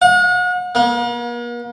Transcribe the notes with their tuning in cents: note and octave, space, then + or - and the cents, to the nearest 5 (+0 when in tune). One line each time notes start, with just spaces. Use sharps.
F#5 -40
A#3 +45